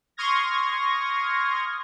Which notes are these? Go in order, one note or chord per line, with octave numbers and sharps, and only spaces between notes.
C6 C#6 D#6 F6 G#6 A#6